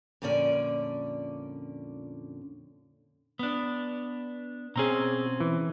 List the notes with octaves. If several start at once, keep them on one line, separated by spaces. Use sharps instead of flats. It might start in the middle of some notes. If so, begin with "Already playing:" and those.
F2 A#2 D3 C#4 D5
B3 D4
B2 C4 C#4 G#4 A#5
E3